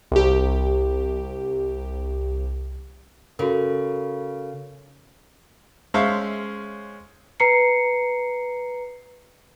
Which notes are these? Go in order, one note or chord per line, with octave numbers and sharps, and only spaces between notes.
C2 G4
C#3 F#4 A4 A#4
G#3 C#4 C5 C#5 E5 F5
B4 A#5 C7 C#7